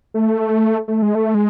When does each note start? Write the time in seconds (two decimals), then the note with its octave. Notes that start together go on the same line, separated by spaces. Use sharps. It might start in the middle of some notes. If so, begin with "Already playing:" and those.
0.14 A3
0.88 A3
1.02 G#3
1.15 A3
1.34 G#3